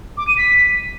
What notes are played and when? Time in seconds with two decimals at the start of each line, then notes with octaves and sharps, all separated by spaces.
0.17 D6
0.28 D#7
0.38 B6